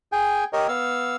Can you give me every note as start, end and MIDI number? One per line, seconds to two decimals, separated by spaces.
0.12 0.44 68
0.12 0.44 79
0.12 0.44 80
0.53 0.67 67
0.53 0.67 70
0.53 0.67 73
0.53 0.67 75
0.68 1.16 59
0.68 1.16 77
0.68 1.16 88